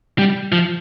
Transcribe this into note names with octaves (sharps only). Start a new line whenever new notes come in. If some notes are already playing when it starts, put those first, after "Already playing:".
G3
F3